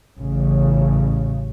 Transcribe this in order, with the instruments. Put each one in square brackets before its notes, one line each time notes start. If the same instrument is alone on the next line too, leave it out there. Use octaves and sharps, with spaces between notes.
[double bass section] A1 C#3